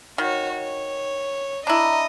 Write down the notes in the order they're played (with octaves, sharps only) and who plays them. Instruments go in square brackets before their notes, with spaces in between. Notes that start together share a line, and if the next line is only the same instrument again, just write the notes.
[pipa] D#3 [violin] F#4 C#5
[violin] C#5
[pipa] D4 E4 [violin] D#5 [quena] A#5